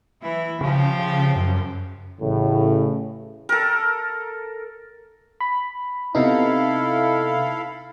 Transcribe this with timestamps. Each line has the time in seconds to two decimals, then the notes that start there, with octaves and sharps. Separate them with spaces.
0.22 E3 E4
0.61 C#3 F3 G4
1.36 F#2
2.21 A1 A2 C#3
3.49 A4 A#4
5.40 B5
6.15 C3 B3 D#4 E4 A4 F5